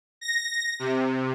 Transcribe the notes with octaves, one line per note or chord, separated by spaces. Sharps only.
A#6
C3